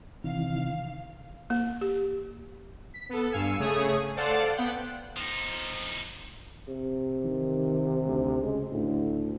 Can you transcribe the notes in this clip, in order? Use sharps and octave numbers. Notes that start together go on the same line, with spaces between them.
C3 D#3 E3 F5
A#3
G4
B6
B3 A4
G2 F5 G#5 E6 C#7
C#3 A3 G#4 C#5 G#5 D#6
A4 C5 D5 F5 F#5 A5
B3 F#5 G5
F3 D#4
C3
D#3
D2
C#3 G#3
D2 A2